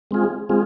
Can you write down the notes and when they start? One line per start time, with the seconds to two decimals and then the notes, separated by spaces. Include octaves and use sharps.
0.11 G#3 C4 F4 G#4
0.49 G#3 C4 F4 G#4